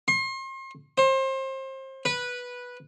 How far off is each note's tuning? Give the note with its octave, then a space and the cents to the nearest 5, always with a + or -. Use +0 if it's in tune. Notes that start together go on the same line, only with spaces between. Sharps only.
C6 +40
C5 +30
B4 -10